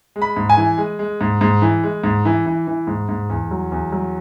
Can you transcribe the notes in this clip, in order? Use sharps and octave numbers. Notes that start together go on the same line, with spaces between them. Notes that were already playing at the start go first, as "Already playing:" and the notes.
G#3
B5
G#2
G#5
E3
G#3
G#3
G#2
G#2
E3
G#3
G#2
E3
E3
E3
G#2
G#2
E2
F#3
E2
F#3